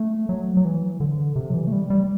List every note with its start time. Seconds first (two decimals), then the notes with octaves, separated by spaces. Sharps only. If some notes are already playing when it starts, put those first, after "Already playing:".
Already playing: A3
0.29 F#3
0.57 F#3
0.65 E3
1.00 D3
1.36 C3
1.50 F#3
1.54 E3
1.67 A3
1.72 G3
1.90 G3